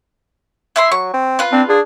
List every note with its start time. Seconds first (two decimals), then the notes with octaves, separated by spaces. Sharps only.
0.76 E4 E5 C6
0.92 F#3 C#6
1.14 C4
1.39 F4 B4
1.53 C4 D4
1.69 D4 G#4